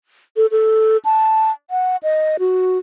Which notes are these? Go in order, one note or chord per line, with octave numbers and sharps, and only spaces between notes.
A4
A4
A5
F#5
D#5
F#4